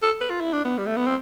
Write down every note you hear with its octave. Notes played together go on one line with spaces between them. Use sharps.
A4
B4
F4
E4
D4
B3
G3
A3
B3
C4